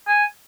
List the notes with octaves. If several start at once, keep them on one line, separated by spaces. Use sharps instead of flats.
G#5